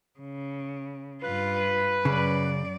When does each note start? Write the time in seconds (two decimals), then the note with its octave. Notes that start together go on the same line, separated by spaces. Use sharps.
0.19 C#3
1.23 G2 F4 B4
2.05 F#2 C#3 D5